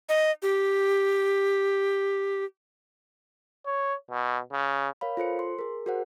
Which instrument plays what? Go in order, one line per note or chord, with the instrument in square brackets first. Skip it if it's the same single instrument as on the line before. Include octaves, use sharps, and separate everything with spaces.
[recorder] D#5
G4
[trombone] C#5
B2
C#3
[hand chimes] A#4 C#5 F5 B5
F4 A4 C5 C#7
C6
G#4 A#4
F#4 G#4 A#4 C5 F#5